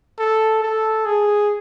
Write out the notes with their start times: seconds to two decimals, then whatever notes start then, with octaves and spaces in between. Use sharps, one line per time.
0.19 A4
0.63 A4
1.06 G#4